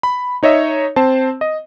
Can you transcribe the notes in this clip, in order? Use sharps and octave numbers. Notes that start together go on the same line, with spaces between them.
B5
D#4 C#5 D#5 E5
C4 C5 A5
D#5